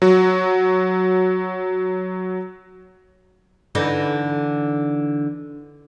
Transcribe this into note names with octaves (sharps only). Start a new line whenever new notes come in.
F#3 F#4
D3 E3 D#4